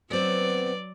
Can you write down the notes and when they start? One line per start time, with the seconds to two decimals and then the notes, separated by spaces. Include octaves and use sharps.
0.11 F#3 B3 C4 D5